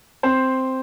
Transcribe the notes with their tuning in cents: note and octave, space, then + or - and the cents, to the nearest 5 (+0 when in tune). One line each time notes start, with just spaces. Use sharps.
C4 +0 C5 +0